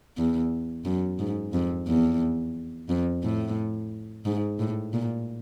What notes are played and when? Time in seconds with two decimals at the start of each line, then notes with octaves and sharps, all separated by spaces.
0.17 E2
0.85 F#2
1.19 G#2
1.53 F2
1.87 E2
2.89 F2
3.23 A2
4.25 G#2
4.59 A2
4.93 A#2